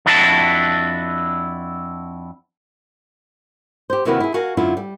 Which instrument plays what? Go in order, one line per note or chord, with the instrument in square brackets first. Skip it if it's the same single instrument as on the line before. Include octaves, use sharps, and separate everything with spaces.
[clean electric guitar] F2 D4 E4 F#4 G#4 A5
[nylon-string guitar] G4 C5
C3 D#3 A#3 E4 F#4 B4
E4 G#4
F#4 A#4 F5 G#5
F#2 D3 E4 F4
G3